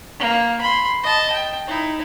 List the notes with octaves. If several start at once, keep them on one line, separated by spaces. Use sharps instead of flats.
A#3
B5 C6
D#5 A5
G5
D#4 E4